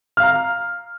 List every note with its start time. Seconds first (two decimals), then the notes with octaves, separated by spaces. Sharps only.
0.17 F6
0.20 F5
0.23 A#5